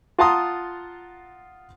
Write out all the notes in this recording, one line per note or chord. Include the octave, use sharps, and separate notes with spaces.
F4 F#5 A5 A#5 C6 D#6